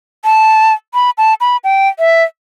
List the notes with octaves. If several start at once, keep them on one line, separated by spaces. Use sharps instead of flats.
A5
B5
A5
B5
G5
E5